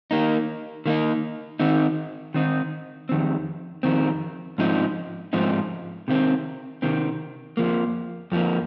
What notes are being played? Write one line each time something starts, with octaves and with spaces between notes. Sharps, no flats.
D#3 A#3 D#4
D#3 A#3 D#4
D#3 C4 D#4
D#3 C4 D#4
F2 D#3 C4
F2 D#3 C4
G#2 F3 C4 D#4
G#2 F3 C4 D#4
C3 D#3 C4
C3 D#3 C4
F2 F3 A#3
F2 F3 A#3